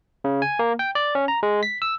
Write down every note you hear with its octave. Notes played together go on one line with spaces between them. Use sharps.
C#3
G#5
A#3
G5
D5
C#4
A#5
G#3
B6
E6